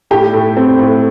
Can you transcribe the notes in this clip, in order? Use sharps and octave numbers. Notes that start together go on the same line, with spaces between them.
A2 G4
A2
C4
A2